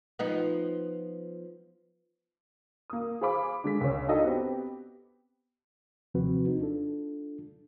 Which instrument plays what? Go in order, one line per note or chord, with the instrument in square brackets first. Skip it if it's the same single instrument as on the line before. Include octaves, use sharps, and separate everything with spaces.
[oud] F3 B3 D#4
[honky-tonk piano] A#3 D#6
G#4 C5 F5 B5 D6
D3 G#3 B6
C#2 C#4
D4 D#4 F#4 A4 D#5
B3 C4 G4
[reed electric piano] D#2 C3 F3 C4 F#4 B4
D#4
D4 F4 A4